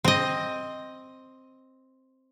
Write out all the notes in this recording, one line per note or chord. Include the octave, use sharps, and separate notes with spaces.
C4 D#5